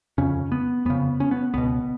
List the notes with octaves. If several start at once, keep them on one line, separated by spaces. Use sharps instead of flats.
F2 C#3 C#4
B3
F2 C#3 B3
C#4
B3
C#2 B2 B3